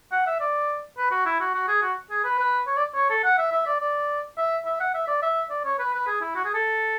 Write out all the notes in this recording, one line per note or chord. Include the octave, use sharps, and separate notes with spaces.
F#5
E5
D5
B4
F#4
E4
F#4
F#4
G#4
F#4
G#4
B4
B4
C#5
D5
C#5
A4
F#5
E5
E5
D5
D5
E5
E5
F#5
E5
D5
E5
D5
C#5
B4
B4
G#4
E4
F#4
G#4
A4